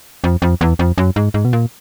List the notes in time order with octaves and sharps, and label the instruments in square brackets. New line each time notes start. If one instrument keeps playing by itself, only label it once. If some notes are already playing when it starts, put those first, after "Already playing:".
[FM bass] F2
F2
E2
F2
F#2
G#2
G#2
B2
A#2